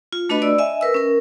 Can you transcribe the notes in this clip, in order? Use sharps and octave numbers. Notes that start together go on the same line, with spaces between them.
F4
A3 D4 F#4 B4 D#5 B5
D5 E6
D#5 E5 G#5
A#4 B4 E6
C#4 A#4